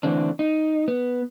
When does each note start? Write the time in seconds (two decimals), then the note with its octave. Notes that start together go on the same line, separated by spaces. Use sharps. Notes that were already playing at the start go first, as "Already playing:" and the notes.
0.03 D3 E3 A3 C4 D4
0.39 D#4
0.88 B3